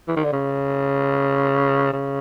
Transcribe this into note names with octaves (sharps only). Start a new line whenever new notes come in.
E3
D#3
D3
C#3
C#3